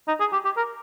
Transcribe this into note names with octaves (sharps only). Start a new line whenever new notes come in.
D#4
G#4
G4
G4
A#4